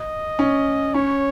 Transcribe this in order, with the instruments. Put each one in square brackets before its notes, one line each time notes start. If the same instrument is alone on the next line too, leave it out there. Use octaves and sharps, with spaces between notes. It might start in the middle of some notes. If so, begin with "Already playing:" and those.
Already playing: [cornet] D#5
[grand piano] C#4
[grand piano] C#4 [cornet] C#5